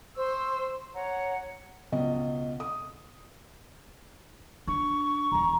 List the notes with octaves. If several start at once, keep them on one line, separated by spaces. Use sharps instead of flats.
C5 C#6 E6
C#5 F#5 A#5
C#2 B2 D#5
D#6
D4 C#6
E1 E3 A#5